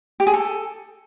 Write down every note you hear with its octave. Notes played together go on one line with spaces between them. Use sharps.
G4
G#4
A4